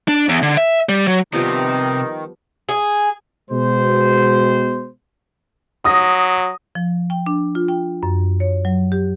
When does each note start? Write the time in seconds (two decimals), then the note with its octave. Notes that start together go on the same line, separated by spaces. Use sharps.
0.08 D4
0.29 E2
0.43 D3
0.57 E5
0.89 G3
1.07 F#3
1.33 C3 D#3 F3 G3 B3 D#4
2.69 G#4
3.50 B2 G#3 C5
5.85 F#3 D#6 A#6
6.75 F3
7.10 G5
7.26 D4
7.55 F4
7.68 G5
8.03 F#2
8.40 C#5
8.65 F#3
8.92 G4